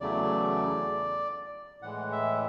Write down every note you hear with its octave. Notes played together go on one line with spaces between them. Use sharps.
E2 C#3 F#3 A3 D5
A2 E3 G#3 F#5
E5